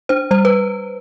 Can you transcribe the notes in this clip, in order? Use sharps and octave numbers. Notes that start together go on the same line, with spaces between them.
D4 C5
G3 C5
B4